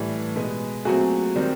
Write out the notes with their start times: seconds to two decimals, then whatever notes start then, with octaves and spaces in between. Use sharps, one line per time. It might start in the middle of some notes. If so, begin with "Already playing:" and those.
Already playing: A2 E3 G3
0.36 B2 G#3 B3
0.85 A#2 F#3 A3 C4 F#4 G#4
1.36 D#3 G3 C4